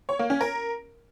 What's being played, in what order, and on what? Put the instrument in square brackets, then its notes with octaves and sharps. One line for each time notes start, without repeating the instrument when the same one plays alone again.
[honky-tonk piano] C#5
A#3
C#4
A#4